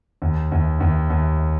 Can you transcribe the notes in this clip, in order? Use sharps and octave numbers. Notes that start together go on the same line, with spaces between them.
D#2
D#2
D#2
D#2